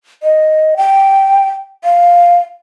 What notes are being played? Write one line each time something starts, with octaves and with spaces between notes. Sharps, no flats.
D#5
G5
F5